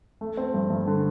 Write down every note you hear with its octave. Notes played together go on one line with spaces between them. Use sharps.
A3
C4
G2
G2
D3